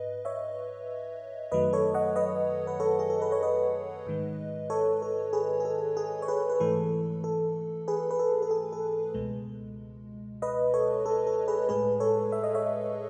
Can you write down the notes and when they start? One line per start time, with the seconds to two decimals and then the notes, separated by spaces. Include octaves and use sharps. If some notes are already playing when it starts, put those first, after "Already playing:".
Already playing: G#2 B4 D#5
0.25 C#5 E5
1.51 F#2 D#3 F#3 A3 B4 D#5
1.73 A4 C#5
1.94 D#5 F#5
2.16 B4 D#5
2.67 B4
2.80 A4 C#5
2.99 G#4
3.10 A4
3.22 B4
3.32 C#5
3.43 B4 D#5
4.07 G#2 D#3 G#3
4.70 A4 C#5
5.02 A4
5.33 G#4 B4
5.60 G#4
5.65 A4
5.97 G#4
6.22 C#5
6.28 G#4 B4
6.49 B4
6.60 G#2 E3 A3 A4
7.24 A4
7.88 G#4 B4
8.11 B4
8.19 A4
8.42 A4
8.51 G#4
8.72 A4
9.14 C#2 B2 G#3
10.42 B4 D#5
10.74 A4 C#5
11.06 A4
11.27 A4
11.48 G#4 B4
11.69 A2 G#3 G#4 B4
12.00 A4 C#5
12.32 E5
12.44 D#5
12.54 C#5 E5